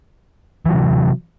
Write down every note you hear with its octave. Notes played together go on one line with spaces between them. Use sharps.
C3 E3 F#3